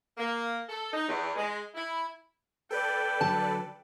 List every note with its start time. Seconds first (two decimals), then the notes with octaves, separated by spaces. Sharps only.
0.18 A#3
0.68 A4
0.93 D#4
1.08 E2
1.36 G#3
1.74 E4
2.71 A4 B4 D5 G5
3.21 D3 F#3 A5